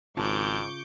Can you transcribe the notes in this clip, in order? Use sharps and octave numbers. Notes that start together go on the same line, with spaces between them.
G#1 G#2 C#3 F4 A5 C#6 D6 G6